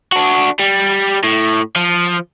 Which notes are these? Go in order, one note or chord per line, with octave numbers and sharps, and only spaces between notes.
D4 F#4
G3
A2
F3